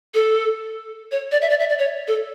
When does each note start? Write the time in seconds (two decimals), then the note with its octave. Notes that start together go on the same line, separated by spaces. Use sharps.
0.14 A4
1.11 C#5
1.32 D5
1.41 E5
1.50 D5
1.60 E5
1.69 D5
1.79 C#5
2.08 A4